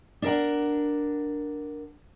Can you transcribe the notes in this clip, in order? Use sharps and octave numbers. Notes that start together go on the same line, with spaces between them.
D4 A#4 F#5